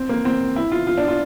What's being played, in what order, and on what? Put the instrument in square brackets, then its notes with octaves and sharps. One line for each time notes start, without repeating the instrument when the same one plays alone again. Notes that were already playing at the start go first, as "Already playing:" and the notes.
Already playing: [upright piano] C4
A#3
C4
E4
F4
F4
D4
F4